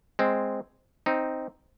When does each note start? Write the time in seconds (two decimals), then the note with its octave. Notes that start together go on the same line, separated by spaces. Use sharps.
0.19 G#3 C4
1.06 C4 D#4